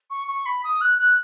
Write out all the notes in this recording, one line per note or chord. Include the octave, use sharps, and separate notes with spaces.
C#6
C#6
B5
D#6
F#6
F#6